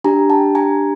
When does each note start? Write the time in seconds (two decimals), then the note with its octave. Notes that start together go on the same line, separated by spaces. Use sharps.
0.04 D4 G4 G#5 A#5
0.30 G5 A5
0.55 G#5 A#5